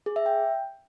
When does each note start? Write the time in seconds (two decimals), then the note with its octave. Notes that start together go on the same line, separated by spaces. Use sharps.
0.06 G#4
0.16 E5
0.26 G5